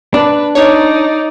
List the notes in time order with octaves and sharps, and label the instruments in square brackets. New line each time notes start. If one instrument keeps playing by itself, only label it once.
[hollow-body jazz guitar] D4 [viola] B4
[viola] D#4 D5 [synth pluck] C#5